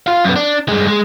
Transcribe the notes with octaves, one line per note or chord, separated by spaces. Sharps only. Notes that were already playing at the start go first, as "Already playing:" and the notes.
F4 F5
F#2 B3
D4
G2 G#3
G#3